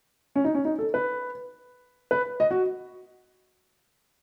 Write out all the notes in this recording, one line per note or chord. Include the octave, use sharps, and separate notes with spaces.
C#4
D#4
C#4
D#4
A4
B4
B4
D#5
F#4